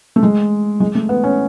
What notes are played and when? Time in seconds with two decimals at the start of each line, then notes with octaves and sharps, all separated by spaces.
0.16 A3
0.23 G#3
0.80 G#3
0.95 A3
1.09 B3
1.24 C#4